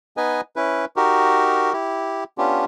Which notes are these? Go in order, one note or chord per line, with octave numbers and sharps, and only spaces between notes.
B3 D#4 B4 D#5 G#5
C#4 E4 B4
D#4 F#4 G4 A#4
E4 G4
B3 C#4 D4 F4 G4